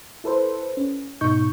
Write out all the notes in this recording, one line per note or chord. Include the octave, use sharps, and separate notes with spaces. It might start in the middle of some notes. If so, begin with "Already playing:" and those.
E4 A4 B4 C5
C#4
G#2 B2 D#4 C#6 G6